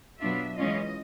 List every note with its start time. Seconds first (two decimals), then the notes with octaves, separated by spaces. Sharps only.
0.21 B2 F#3 B3 D4 F4 E5
0.57 E3 G#3 C#4 F4 D#5